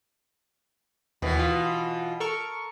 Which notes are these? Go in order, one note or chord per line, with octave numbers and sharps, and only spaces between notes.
D#2 B2 E3
F4
A4 A#4 C#6